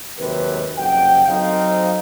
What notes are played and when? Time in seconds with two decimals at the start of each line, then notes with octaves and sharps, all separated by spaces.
0.19 D#2 G#2 C3 F#3 A#4 B4
0.78 F#1 F2 C3 F#5 G5
1.29 F#3 C4 D#4 A4 C5 F5